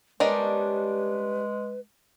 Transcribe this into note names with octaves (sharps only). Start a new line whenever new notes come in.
G3 G#3 B3 C#4 D4 A#4 B4 D#5